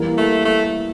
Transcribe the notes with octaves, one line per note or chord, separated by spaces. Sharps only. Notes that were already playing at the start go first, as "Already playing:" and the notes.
Already playing: E3 G3 A#3
A3
A3